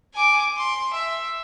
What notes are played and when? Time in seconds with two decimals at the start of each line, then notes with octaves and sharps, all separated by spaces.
0.14 G#5 D6
0.57 C6
0.93 E5